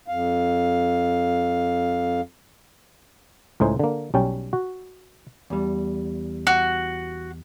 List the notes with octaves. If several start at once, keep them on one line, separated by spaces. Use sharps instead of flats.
F2 F5
C#2 A2 D#4 C5 G#5
D3 A#3
B1 G3 C#4 G5 A5
F#4
E2 G3
F#4